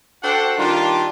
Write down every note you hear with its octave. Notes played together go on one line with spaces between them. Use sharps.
D4 F#4 A4 C5 F#5 G5
D#3 G3 D4 F4